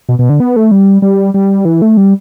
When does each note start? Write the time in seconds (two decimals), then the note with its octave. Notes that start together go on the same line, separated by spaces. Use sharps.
0.09 B2
0.19 B2
0.29 D3
0.40 B3
0.56 A3
0.71 G3
1.02 G3
1.34 G3
1.65 E3
1.82 A3
1.97 G3